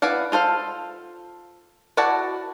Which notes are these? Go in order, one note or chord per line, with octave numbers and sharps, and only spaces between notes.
E4 B4 D5 F5 F#5
F4 A4 C5 F5
E4 F#4 D5 F#5 A5